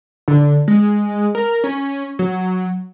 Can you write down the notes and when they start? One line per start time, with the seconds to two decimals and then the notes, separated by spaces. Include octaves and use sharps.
0.28 D3
0.68 G#3
1.35 A#4
1.64 C#4
2.19 F#3